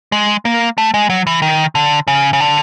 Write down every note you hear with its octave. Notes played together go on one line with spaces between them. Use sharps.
G#3
A#3
A3
G#3
F#3
E3
D#3
D3
C#3
C#3
D3